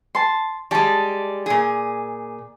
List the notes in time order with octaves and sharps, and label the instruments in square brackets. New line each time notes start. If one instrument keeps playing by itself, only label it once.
[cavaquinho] A5 C6
[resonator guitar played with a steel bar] G3 G#3 [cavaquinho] D5 A5
[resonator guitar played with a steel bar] A#2 G#4